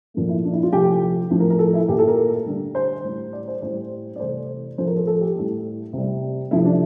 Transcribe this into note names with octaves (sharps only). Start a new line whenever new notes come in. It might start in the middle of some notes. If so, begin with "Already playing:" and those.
A#2 F3 A3
E4
D4
E4
F4
C3 F3 A3 G4
A2 F3 A3
A#4
A#4
A4
E4
A#2 A3 G4
A4
A#4
D3 G3
C5
A2 G3
D5
C5
A2 G3 C5
D5
C3 E3 A3 C5
A2 F3 A3 C5
A#4
A4
A4
G4
A2 G3
C3 G3
C3 F3 A3 E4
D4